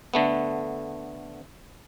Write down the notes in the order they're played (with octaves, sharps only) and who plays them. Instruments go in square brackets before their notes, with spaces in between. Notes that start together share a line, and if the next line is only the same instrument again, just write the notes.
[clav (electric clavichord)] D3 A3 B3